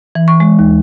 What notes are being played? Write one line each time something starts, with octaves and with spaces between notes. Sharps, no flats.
E3
C#6
G#3
D#2